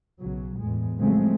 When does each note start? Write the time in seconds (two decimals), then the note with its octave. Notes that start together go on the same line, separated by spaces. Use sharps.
0.20 B1 C#3 F#3
0.58 E2 A2 G#3
0.99 C#3 F3 F#3 G#3 A3 C4